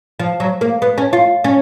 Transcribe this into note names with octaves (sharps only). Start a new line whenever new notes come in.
F3
F#3
A#3
B3
C#4
F4
C#4